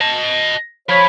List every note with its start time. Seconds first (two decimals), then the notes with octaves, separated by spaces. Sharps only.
0.01 D#5 A5
0.89 F3 C#5 B5